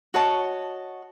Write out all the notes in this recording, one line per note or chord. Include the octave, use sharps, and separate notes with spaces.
F#4 C#5 D#5 A5